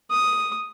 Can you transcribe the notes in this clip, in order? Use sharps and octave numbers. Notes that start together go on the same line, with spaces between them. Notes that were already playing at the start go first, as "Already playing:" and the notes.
D#6